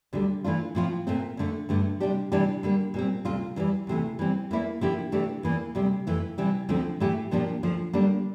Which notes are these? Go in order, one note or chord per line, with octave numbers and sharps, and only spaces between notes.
D2 D3 G3
E3 A3 D4 F4
A2 F3 C4 F4
A#2 A3 C4
F2 D3 A3
G2 D3 A3
C3 G3 D4 G4
C3 E3 G3 D4 G4
D3 G3 A#3
A#2 G3 C4
D2 C3 G3 C4 F4
E2 E3 G3
D2 C3 E3 A3
E3 G3 C4
E2 E3 A#3 E4
D3 F3 A#3 E4 G4
C3 E3 A3 D4 G4
E2 E3 A#3
D2 C3 G3
F2 E3 A3
C3 E3 G3 C4
D2 D3 F3 A3 C4
A2 E3 A3 E4 G4
A#2 F3 A#3 D4 G4
D2 D3 F3
D3 G3 A#3 D4